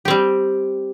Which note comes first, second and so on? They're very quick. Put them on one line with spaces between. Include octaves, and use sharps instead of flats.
G4 C4 G3